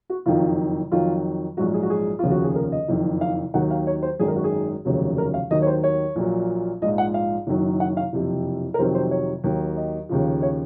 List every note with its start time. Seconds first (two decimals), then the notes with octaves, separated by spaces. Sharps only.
0.10 F#4
0.26 F#1 F2 D#3 F#3 F4
0.92 F2 D#3 F#3 F4
1.57 A#1 G#2 F#3 F#4
1.74 G#4
1.83 F#4
1.90 G#4
2.19 F1 D#2 C#3 F3 F4
2.31 F#4
2.43 G#4
2.56 A#4
2.72 D#5
2.88 F#1 F2 D#3
3.21 F5
3.54 D#2 D#3 F#3 F#5
3.71 F5
3.87 C#5
4.03 C5
4.19 G#1 F#2 D#3 G#4
4.28 A#4
4.36 F#4
4.44 G#4
4.85 F1 D#2 C#3 F#3
5.18 A#4
5.34 F5
5.50 D#2 D#3 F#3 D#5
5.62 C#5
5.67 C5
5.84 C#5
6.16 A#1 A#2 F#3
6.82 A#1 G#2 F3 D#5
6.98 F#5
7.14 F5
7.47 F#1 F#2 D#3 F#3
7.80 F#5
7.97 F5
8.13 F#1 F2 C3
8.74 A#4
8.78 F2 C3 D#3 F#3 C5
8.95 C5
9.11 C#5
9.44 D#2 D#3 F#3
9.77 D#5
10.09 D#2 C#3 F3
10.42 C#5